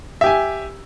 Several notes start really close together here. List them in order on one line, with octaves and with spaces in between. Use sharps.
E5 G4 G#5